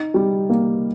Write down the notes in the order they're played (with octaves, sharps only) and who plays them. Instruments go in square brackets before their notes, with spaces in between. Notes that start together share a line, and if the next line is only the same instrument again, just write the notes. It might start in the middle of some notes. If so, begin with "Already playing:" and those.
Already playing: [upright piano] D#4
G3
A#3